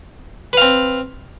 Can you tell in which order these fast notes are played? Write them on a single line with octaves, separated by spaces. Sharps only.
B4 F5 C4